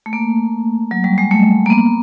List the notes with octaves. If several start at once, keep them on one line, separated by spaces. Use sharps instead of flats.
A3
A#3
F#3
G3
G#3
A3
A#3
B3